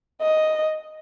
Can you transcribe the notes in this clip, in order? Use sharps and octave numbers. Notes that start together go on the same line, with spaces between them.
D#5